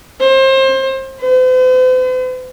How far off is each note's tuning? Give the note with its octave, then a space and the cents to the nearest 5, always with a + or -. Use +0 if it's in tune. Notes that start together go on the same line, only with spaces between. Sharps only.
C5 +30
C5 -45